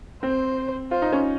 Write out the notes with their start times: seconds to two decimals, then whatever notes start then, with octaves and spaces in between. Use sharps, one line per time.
0.23 C4 C5
0.91 F4 C5
1.02 D#4
1.13 C#4